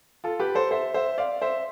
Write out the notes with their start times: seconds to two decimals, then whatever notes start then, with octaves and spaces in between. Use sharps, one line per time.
0.24 F4 A4
0.40 G4 B4
0.55 A4 C5
0.71 C5 E5
0.94 C5 E5
1.18 D5 F5
1.42 C5 E5